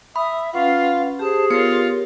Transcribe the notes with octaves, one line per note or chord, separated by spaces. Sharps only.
E5 B5 D#6
C#4 F4 B4 F5 F#5
G4 G#4 C5 A5
B3 F4 G4 A#4 C#5 C#7